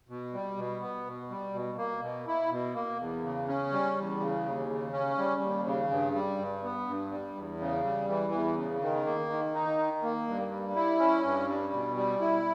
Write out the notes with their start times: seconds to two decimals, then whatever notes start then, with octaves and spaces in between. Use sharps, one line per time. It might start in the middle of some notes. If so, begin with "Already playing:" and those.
0.09 B2
0.33 G3
0.57 B2
0.81 B3
1.06 B2
1.30 G3
1.54 B2
1.78 A#3
2.02 B2
2.27 E4
2.51 B2
2.75 A#3
2.99 E2
3.23 C#3
3.48 C#4
3.73 G3
3.96 E2
4.20 C#3
4.45 D#2
4.69 C#3
4.93 C#4
5.18 G3
5.41 D#2
5.66 C#3
5.91 G2
6.15 G3
6.38 G2
6.63 B3
6.87 G2
7.11 G3
7.35 E2
7.60 C#3
7.84 G3
8.09 E3
8.33 E2
8.57 C#3
8.82 D#3
9.06 A#3
9.30 D#3
9.54 D#4
9.78 D#3
10.03 A#3
10.27 G2
10.51 G3
10.75 E4
10.99 C#4
11.24 G2
11.48 G3
11.73 B2
11.96 G3
12.21 E4